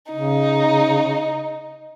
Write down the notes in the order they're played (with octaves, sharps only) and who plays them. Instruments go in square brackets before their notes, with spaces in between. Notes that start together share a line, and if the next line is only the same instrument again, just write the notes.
[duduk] C#3 [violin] D#4